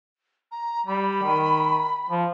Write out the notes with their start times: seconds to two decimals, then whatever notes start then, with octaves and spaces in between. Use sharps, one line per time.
0.51 A#5
0.87 G3 B5
1.23 D#3
2.10 F3